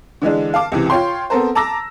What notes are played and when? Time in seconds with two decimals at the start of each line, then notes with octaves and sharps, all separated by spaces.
0.22 D3 E3 G#3 D4
0.54 F5 A5 D6
0.72 C#2 C3 E3
0.90 F4 C#5 G5 C6
1.30 B3 C4 A4 A#4 C5
1.55 A5 A#5 D6 E6 A#6